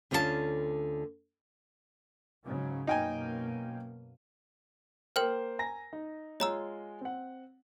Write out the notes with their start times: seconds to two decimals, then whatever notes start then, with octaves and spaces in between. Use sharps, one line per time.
0.11 D2 D3 C#4 F4 G4 A5
2.45 G#2 C#3 F#3
2.87 F#2 B2 A#3 D#4 G5 G#5
5.16 A#3 A#4 C5 G5 F6
5.59 G#5 A#5 A#6
5.93 D#4
6.40 G#3 F4 C#5 A#5 E6
7.01 C4 F#5